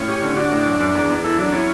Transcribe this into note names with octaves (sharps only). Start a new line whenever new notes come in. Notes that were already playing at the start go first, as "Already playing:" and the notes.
Already playing: A2 C#4
G4
D3
D4 F#4
A2
F#2
F#2
E2
E2
E4 A4
F#3 D4
C#4 E4